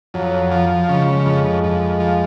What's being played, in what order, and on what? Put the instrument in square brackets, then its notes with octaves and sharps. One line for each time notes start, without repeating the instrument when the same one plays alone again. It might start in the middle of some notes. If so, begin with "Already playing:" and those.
[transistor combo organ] F2 [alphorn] F#3
[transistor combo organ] F3
[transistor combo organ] C#3 [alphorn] G#3
[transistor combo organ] F2
F2
F3